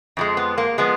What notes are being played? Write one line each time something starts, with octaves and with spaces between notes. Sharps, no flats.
F2 F3 G#3
B3
A#3
F3 G#3 B3